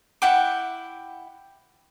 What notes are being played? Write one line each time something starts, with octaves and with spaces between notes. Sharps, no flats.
E4 F#5 G5 D6